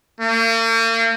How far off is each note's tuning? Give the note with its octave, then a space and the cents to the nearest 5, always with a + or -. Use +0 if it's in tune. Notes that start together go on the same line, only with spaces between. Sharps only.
A#3 -40